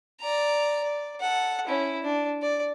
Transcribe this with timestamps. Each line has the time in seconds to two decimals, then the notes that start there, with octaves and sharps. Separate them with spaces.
0.21 D5 A#5
0.83 D5
1.21 A4 F#5
1.67 C#4 E4
2.03 D4
2.42 D5